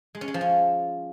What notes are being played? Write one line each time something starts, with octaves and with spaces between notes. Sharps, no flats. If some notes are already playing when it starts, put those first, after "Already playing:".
G#3
C#4
G#3
F3
C#4